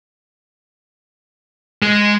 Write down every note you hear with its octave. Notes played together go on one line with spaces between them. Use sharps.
G#3